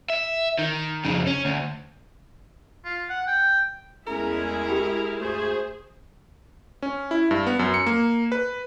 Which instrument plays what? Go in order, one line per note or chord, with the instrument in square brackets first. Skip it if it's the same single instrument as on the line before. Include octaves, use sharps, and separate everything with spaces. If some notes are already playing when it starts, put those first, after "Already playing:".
[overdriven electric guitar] E5
D#3
F2 C#3
C#4
D2
[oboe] F4
F#5
G5
[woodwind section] E2 A3 C#4 [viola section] G#3 E4 G#4 [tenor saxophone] A#4 [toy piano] A#5
[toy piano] F#4 G4 G5
[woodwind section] D2 G2 A3 [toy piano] F#4 [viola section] G#4 C5
[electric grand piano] C#4
E4
G2
B3
F#2
C#7
A#3
B4